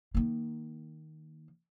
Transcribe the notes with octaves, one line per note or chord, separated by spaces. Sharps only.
D#3 A#3